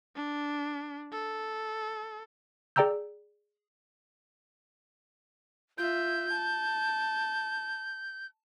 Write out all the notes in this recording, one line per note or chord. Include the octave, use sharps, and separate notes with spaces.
D4
A4
G#4 D5 G5 A#5 E6 G6
F4 E5 G6
A5